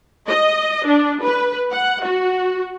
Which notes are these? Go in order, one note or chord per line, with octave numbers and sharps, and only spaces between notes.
D#5
D4
B4
F#5
F#4